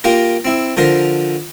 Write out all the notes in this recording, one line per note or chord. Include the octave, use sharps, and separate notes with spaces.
A#3 F4 G4 A#4
C4 E4
D3 F3 A#4 C5